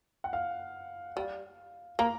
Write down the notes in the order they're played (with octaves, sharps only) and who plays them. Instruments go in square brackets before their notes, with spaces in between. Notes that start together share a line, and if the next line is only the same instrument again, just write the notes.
[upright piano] F#5
F5
[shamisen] G3 [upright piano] F5
[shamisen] A#3 [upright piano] A#5